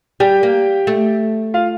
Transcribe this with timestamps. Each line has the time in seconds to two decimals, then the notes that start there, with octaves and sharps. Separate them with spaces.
0.20 G3 G4 G5
0.43 A#3
0.87 A3
1.54 F4 F5